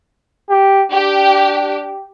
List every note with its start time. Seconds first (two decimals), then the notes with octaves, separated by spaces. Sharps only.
0.50 G4
0.92 D4 G4